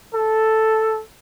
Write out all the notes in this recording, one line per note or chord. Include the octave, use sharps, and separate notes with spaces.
A4